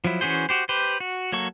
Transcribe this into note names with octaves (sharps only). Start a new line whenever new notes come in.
F3 F#3 E4
E3 C#4 F#4 G#4 C5
F#4 G4 C5
G4 B4 C5
F#4
F#3 A#3 A4 C#6